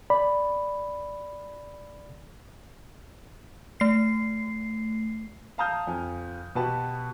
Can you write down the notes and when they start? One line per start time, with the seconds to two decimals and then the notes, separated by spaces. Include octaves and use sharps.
0.10 D5 B5
3.80 A3 C7
5.58 F5 A5 A#5 D#6 F6 G6
5.87 F2 G#5
6.55 B2 F#4 G4 B4 A5